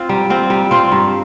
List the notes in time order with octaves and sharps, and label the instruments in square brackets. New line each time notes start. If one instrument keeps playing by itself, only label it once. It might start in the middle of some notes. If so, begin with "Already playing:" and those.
Already playing: [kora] C4 F4
[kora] G3 [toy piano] A#5
[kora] C4 F4
[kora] G3 [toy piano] A#5
[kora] C4 F4 [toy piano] C6
[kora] G2 [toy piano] A#5